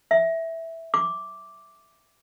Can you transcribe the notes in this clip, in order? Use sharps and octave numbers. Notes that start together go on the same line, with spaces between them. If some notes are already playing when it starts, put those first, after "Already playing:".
E5
D6